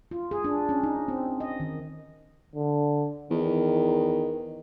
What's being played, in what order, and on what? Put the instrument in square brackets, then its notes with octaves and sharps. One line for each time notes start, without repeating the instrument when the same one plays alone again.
[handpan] F4
G#4
D4
C#4
D#4
C4
D#5
D#3
[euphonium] D3
[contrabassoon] E2 [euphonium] D#3